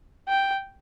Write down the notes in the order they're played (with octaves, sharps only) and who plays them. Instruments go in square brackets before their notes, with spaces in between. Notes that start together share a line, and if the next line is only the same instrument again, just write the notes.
[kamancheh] G5